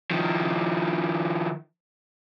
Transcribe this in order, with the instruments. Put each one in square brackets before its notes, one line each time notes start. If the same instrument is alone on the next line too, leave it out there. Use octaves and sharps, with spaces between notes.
[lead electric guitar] D#3 F3